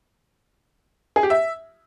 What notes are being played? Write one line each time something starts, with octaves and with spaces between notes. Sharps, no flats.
G#4
G4
E5